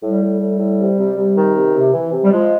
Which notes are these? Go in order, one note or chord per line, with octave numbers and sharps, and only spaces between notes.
A2 G3
A2
A2
A2
C3
C3
C3
D#3
C3
C3
E3
C3
G3
F3 G#3